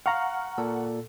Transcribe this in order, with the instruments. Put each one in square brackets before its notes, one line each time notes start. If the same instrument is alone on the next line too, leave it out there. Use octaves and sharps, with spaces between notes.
[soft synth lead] F5 [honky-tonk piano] F#5 [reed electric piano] A#5 C#6 F6
[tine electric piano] A#2 [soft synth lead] A4